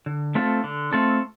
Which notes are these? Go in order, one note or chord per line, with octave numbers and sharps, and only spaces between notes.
D3
A3 C4 F4 A4
D3
A3 C4 F4 A4